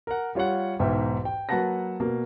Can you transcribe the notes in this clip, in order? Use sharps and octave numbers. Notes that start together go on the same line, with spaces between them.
A#4 F#5
G3 F4 C#5 F5 F#5
B1 E2 G#2 E5 G5
G5
F#3 A#3 B4 F#5 A5 A#6
B2 A#3